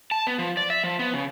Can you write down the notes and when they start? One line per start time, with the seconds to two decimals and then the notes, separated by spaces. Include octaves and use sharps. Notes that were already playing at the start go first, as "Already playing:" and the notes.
0.11 A5
0.27 B3
0.38 F3
0.57 D5
0.70 E5
0.84 F3
0.99 B3
1.14 C#3